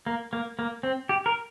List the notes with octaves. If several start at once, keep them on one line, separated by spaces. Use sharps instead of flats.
A#3
A#3
A#3
C4
G4
A#4